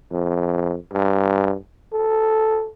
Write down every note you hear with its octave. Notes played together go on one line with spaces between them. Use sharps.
F2
G2
A4